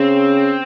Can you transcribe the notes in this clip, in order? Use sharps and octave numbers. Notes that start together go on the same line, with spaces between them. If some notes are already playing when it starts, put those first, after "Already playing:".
Already playing: C#3 C4